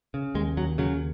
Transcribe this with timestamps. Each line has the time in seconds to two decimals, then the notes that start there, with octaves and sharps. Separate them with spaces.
0.14 C#3
0.35 D#2 G#3
0.57 D#2 F#3
0.78 C#3 F#3